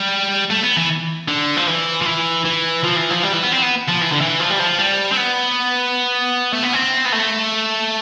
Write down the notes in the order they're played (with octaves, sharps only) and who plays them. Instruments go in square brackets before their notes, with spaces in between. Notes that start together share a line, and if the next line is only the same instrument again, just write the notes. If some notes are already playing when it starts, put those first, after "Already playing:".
Already playing: [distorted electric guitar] G3
A3
B3
E3
D3
F3
E3
F3
E3
E3
F3
E3
F3
G3
E3
B3
C4
B3
F3
E3
D3
E3
F3
G3
F3
G3
C4
B3
A3
B3
C4
B3
A3